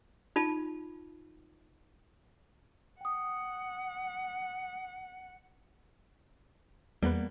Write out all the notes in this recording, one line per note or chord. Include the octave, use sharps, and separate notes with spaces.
D#4 F4 A5
F#5 G5 D#6
E2 G3 A#3 B3 B4